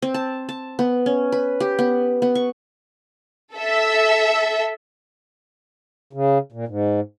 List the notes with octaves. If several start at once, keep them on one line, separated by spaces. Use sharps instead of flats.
C4
A5
A5
B3
C#4
B4
G4
B3
B3
C#6
A4 E5
C#3
A#2
G#2